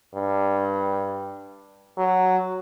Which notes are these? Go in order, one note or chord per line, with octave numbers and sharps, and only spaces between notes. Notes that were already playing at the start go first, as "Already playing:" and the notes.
G2
F#3